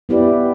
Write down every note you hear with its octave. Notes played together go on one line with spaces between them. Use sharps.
B3 E4 G4 B4 D5